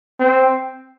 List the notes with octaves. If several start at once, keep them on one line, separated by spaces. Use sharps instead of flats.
C4